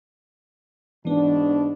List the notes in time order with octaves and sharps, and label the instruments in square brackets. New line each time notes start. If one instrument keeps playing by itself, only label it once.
[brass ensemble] G#2 B2 D4 [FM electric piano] E3 B3